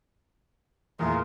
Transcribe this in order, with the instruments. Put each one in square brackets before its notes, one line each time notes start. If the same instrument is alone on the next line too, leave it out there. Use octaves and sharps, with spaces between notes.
[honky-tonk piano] E2 A#2 A3 [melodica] F4 G#4 A#4